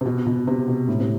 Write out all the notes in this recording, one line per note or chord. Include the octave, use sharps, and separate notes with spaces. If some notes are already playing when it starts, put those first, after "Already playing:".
C3
B2
B2
C3
B2
A2
C3